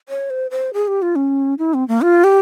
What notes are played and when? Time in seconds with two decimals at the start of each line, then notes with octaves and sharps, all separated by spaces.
0.09 C#5
0.30 C5
0.51 C5
0.74 G#4
0.88 G4
1.02 F4
1.16 C#4
1.59 E4
1.74 C4
1.88 A#3
2.02 F4
2.24 G4